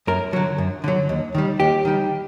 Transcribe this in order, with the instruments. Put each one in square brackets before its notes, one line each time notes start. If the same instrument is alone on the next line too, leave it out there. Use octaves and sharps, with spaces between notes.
[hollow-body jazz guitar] F#2 A#4
D3 F#3
F#2
D3 F#3
D#2
D#3 G3
D#2 G4
D#3 G3